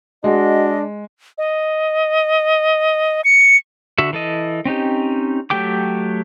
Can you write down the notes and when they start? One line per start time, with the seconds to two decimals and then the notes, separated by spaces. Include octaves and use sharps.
0.24 G#3 D4 F#4 D#5
1.38 D#5
3.24 C#7
3.98 D3 F#4 E5
4.13 E3 A4 D#5
4.65 C4 C#4 D#4 G4
5.50 F#3 A3 G4 G5 D6